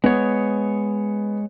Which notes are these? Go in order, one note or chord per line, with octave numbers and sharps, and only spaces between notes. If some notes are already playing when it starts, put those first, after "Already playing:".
G#3 B3 C#5